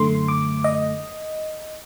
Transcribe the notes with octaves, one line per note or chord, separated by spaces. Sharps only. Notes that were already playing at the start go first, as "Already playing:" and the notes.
Already playing: F#2 D3 A3 C6
D6
D#5